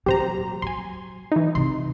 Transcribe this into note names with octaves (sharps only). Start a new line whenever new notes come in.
A#2 F#3 G4 C5 A#5
F#3 G#5 C6
E3 D#4
C3 C6